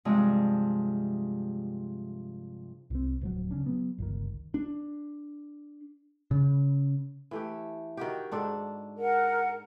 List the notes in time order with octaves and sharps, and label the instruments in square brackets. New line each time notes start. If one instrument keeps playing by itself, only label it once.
[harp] G2 C3 F3 G#3
[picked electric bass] C2 C4
D1 F3 F#3
C#3 C#4 D4
F#3 B3
G1 C#2 D#3
D4
C#3
[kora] E3 A3 G4
D#3 F#4 G4
G#2 D4 A4
[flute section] A#4 F#5